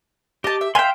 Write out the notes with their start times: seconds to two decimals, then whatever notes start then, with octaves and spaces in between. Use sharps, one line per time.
0.44 D#4 G4 A5
0.61 E5
0.75 E5 F5 G5 G#5 C6